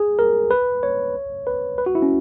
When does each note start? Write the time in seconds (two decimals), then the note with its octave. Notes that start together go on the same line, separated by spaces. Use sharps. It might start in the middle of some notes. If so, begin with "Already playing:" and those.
Already playing: G#4
0.19 A#4
0.51 B4
0.83 C#5
1.47 B4
1.78 B4
1.86 F#4
1.95 E4
2.02 C#4